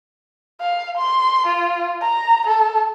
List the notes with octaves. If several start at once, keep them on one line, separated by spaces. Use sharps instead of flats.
F5
C6
F4
A#5
A4